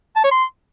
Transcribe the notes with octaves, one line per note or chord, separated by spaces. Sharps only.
A5
C#5
C6